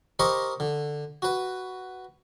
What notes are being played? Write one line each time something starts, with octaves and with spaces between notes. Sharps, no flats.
G4 A#4 C5 D#5 B5 C#6
D3
F#4 B4